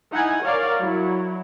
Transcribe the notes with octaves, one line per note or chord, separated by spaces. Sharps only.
D#4 E4 F#5 G#5
A#4 C#5 D5 F5
F#3 E4